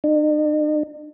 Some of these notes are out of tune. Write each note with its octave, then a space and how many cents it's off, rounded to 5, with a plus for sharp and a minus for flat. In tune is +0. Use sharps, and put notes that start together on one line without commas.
D#4 -45